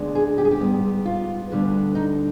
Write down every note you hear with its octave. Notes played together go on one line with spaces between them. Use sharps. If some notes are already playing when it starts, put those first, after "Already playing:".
Already playing: D2 D3 G#3 B3
G#4
G4
G#4
G4
G#2 G3 B3
F4
D2 D3 G3 B3
D#4